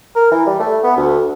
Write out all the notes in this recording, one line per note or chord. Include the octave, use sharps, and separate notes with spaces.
A#4
E3
G3
A3
B3
D2